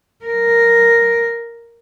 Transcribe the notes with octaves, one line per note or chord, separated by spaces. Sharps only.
A#4